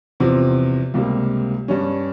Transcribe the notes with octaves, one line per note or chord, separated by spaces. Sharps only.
E2 C3 F3 C4
C#2 C3 G3 A#3
G2 G3 C#4